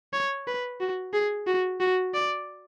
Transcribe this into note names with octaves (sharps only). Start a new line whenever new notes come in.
C#5
B4
F#4
G#4
F#4
F#4
D5